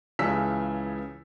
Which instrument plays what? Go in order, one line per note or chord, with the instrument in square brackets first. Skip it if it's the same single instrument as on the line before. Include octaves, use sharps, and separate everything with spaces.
[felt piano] C#2 C#3 E3 A5 E6 B6